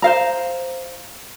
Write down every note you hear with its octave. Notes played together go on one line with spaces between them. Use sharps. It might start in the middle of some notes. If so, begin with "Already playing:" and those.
C5 F5 A#5